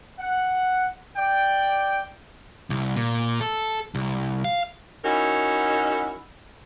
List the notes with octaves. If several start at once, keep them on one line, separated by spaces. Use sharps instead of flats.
F#5
D5 G5
C2
A#2
A4
C2
F5
C#4 D#4 E4 F#4 A#4